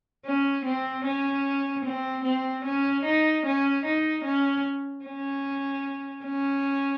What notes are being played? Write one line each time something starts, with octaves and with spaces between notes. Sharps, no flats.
C#4
C4
C#4
C4
C4
C#4
D#4
C#4
D#4
C#4
C#4
C#4